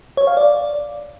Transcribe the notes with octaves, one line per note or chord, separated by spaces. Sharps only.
C#5
F5
D5